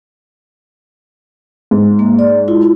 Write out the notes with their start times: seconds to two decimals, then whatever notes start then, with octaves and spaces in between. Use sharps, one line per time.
1.71 G#2
1.99 A#3
2.19 D5
2.48 E4 F4